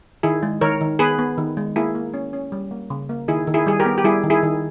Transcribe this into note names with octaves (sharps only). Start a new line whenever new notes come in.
D#3 E4 G#4
G#3
D#3 A#4 C#5
D#3
B3 G#4 B4
B3
D#3
G#3
A#3 E4 G#4
A#3
C#4
C#4
G3
A#3
C#3
A#3
D#3 E4 G#4
D#3
E4 G#4
G3 G#4
G4 A#4
B3
G4
G3 E4 G#4
D#3
E4 G#4
D#3